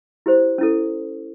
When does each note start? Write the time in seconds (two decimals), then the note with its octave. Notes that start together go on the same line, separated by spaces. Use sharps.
0.26 E4 G4 C5
0.58 C#4 E4 A4